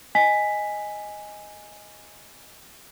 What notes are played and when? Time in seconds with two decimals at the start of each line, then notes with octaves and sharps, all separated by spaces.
0.15 D#5 G#5 B6